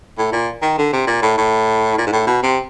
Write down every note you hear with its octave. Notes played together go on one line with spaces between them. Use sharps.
A2
A#2
D#3
D3
C3
A#2
A2
A2
A#2
G#2
A2
B2
C3